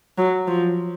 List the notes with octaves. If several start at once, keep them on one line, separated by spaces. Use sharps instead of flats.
F#3
F3